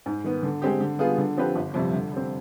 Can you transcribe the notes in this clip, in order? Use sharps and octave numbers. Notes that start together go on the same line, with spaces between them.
G#2
D#3 B3
D3
G#3 C4 G4
D3
G3 B3 F4 G#4
D3
F3 C4 G4 B4
G1
F2 C3 G3
D3
G3 C4